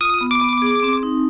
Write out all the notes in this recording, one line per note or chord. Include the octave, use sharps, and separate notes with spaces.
F4 D#6
B3
D6
B3
G#4
C4
D#4